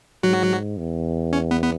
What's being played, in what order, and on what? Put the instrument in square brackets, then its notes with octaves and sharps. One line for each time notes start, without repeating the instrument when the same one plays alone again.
[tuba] G#2 [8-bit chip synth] F#3 F#4
[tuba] E2
[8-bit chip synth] C#4
B3
B3